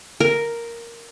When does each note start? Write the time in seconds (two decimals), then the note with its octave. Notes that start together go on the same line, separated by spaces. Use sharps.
0.20 A#4